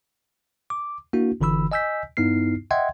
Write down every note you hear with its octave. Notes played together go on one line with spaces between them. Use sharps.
D6
A#3 D4 E4 F#4
G1 D3 E3 B5 E6
D#5 G#5 E6 G6 B6
G2 B3 D#4 E4 F6 C7
D#5 E5 F#5 G5 C6 G#6